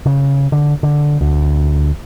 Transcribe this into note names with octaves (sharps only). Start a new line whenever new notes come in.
C#3
D3
D3
D2